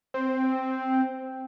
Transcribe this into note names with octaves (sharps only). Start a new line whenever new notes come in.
C4